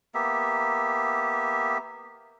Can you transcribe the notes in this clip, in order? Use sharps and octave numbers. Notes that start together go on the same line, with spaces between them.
A#3 B3 G4 E5